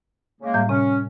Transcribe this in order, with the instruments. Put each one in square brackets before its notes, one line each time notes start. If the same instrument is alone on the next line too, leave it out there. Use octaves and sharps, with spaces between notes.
[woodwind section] C#3 G#3 A#3
[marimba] A2 G3
[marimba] C3 [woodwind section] C#4